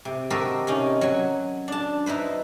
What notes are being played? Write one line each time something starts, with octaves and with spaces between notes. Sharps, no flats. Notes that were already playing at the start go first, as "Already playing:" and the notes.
C3
F#4 G4 A4 A#4 C5 D#5
C3 C#4 D#4
F#3 G#5
D4 A5
D#4 E4 B4 C5